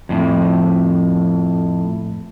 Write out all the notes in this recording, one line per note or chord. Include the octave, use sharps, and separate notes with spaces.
F2 A2